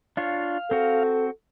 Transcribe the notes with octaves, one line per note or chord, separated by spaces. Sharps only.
D4 F4 C#5 F5
C4 F#4 A4